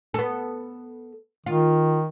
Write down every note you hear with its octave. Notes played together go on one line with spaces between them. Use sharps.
B3 A4
D#3 F4